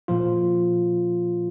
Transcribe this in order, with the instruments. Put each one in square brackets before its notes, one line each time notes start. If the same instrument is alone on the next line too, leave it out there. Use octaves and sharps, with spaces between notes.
[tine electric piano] A#2 F3 F4